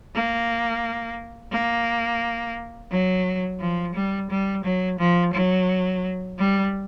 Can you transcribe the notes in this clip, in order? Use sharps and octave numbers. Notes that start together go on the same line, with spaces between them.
A#3
A#3
F#3
F3
G3
G3
F#3
F3
F#3
G3